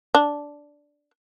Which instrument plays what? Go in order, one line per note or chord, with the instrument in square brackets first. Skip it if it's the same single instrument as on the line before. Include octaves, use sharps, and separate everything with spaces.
[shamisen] D4